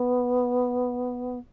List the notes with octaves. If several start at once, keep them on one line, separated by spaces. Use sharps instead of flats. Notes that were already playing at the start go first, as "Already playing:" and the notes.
Already playing: B3